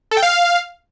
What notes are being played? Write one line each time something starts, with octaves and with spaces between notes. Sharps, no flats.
A4
G5
F5